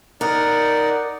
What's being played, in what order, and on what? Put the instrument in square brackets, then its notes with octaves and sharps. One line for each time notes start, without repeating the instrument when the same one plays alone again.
[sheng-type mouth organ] D#4 D5 F#5 [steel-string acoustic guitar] A#4